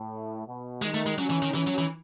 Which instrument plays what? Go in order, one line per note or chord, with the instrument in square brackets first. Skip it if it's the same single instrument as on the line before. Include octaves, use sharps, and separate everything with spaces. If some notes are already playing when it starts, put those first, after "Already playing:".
Already playing: [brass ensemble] A2
B2
[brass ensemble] D#3 [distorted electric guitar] G#3
[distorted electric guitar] A3
G#3
[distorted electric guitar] F#3 [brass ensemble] C#4
[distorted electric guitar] E3
D#3
[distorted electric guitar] E3 [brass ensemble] C#4
[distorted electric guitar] F#3
E3